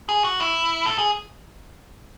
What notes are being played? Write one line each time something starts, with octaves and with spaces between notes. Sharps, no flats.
G#4
F#4
E4
A4
G#4